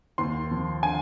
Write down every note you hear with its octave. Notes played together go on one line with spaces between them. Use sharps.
D#2 C6
F3
D3 G#5